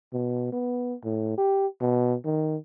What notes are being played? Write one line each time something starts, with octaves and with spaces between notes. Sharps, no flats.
B2
B3
A2
G4
B2
D#3